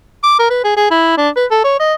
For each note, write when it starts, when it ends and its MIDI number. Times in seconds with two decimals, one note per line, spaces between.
0.23 0.38 86
0.39 0.48 70
0.50 0.60 71
0.64 0.76 68
0.77 0.88 68
0.91 1.17 64
1.18 1.29 62
1.36 1.46 71
1.51 1.60 69
1.64 1.79 73
1.79 1.94 75